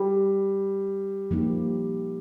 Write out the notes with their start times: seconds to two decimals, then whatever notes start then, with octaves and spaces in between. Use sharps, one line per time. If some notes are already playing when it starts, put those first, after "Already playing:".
Already playing: G3
1.31 F3 A#3 D#4 G4